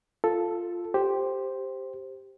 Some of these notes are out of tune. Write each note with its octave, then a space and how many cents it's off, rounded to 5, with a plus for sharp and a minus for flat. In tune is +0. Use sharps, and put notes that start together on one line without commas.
F4 +0 A4 +0
G4 +0 C5 +0